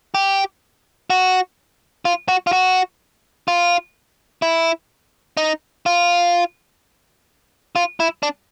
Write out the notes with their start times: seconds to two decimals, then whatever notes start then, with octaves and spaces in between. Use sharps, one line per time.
0.15 G4
1.10 F#4
2.05 F4
2.28 F#4
2.47 F4
2.53 F#4
3.48 F4
4.42 E4
5.37 D#4
5.86 F4
7.76 F4
8.00 E4
8.23 D4